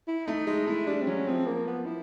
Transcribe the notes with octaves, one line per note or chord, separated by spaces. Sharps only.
E4
A3 D#4
G#3 D#4
A3 E4
G3 D4
C4
F#3 C#4
F3 C4
A#3
B3
E4